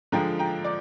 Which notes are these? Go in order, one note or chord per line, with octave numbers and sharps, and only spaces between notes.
D3 F3 G#3 G5 A#5
G5 A#5
D5